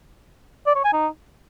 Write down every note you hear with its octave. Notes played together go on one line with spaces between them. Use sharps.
D5
C#5
G#5
D#4